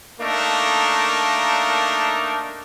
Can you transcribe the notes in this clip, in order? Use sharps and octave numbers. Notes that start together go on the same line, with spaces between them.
A3 A#3 D4 D#4 A4 A#4